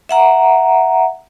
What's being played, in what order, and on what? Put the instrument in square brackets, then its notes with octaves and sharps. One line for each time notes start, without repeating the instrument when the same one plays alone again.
[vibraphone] E5 F#5 A#5